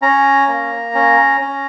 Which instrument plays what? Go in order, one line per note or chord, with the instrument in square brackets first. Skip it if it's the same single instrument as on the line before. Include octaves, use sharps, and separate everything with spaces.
[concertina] C#4 A#5
A#3
C#4
C#4